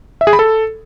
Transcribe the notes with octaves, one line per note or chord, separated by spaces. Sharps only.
E5
G#4
B5
A4